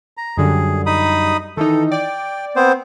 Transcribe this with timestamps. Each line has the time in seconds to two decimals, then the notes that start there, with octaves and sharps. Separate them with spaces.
0.17 A#5
0.37 F#2 D3 G3 G#4
0.86 D#4 B5 D#6
1.57 D#3 E3 D#4 A4
1.92 D5 G5
2.56 B3 C4 C5